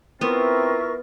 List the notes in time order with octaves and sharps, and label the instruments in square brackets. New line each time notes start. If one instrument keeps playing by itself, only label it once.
[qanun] B3 [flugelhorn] C4 [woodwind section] E4 F4 E5 [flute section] A#4 C#6